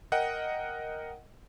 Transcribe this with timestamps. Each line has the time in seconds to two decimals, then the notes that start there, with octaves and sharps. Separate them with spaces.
0.12 A#4 D#5 F#5 G5